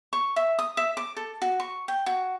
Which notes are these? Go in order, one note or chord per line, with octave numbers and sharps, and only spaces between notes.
C#6
E5
D#6
E5
D6
A4
F#4
C#6
G5
F#4